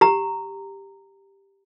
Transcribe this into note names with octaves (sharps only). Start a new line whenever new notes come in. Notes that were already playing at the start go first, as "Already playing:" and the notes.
G4 A#5